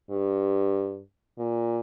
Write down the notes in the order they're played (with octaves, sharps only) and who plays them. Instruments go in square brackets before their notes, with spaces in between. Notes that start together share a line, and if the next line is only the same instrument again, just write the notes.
[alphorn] G2
A#2